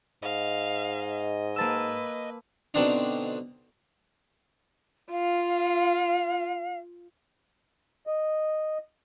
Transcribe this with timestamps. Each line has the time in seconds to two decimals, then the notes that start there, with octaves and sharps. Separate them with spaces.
0.23 G#2 D#5 F5
1.56 A#3 B4 A5 E6
2.74 B2 D3 C4 D4 D#4
5.12 F4 F5
8.07 D#5